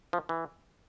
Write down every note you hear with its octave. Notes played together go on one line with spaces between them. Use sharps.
F3
E3